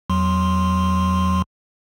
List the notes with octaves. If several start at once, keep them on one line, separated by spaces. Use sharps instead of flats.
E2 F#3 C6